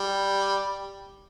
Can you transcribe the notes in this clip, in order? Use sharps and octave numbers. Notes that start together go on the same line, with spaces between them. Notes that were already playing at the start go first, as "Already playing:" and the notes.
Already playing: G3